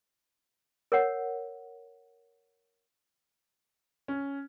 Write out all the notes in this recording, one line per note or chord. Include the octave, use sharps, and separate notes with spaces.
A#4 C#5 F#5
C#4